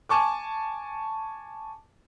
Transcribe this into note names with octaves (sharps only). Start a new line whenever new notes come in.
G#5 A5 C#6 D6